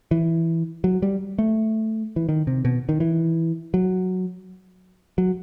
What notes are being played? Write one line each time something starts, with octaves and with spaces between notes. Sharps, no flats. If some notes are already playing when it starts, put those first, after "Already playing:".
E3
F#3
G3
A3
E3
D#3
C3
B2
D#3
E3
F#3
F#3